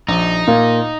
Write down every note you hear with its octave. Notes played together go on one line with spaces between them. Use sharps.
A#1 D#4
A#2 A#3